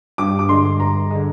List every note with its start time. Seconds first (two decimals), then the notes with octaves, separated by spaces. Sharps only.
0.18 G2 D6
0.39 D6
0.49 D3 G#3 C6
0.80 G2 A#5
1.11 D3 G#3